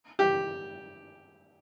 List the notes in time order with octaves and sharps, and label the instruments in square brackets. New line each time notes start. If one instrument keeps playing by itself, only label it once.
[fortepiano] G4